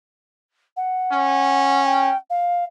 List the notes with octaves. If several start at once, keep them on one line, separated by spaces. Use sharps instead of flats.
F#5
C#4
G5
F5